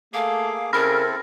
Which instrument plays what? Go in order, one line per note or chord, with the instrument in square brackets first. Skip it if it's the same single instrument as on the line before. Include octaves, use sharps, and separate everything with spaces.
[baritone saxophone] A3 [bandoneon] A#3 G#4 D6 [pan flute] F5
[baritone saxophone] C#3 [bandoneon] C4 E4 A4 [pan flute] A#4 [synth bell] B5 F6 A#6